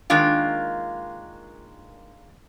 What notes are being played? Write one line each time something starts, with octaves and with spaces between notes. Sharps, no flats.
D#3 G#3 A#3 D4 F4